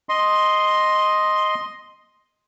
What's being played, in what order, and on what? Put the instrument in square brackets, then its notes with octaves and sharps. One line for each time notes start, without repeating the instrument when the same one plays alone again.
[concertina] D#5 C6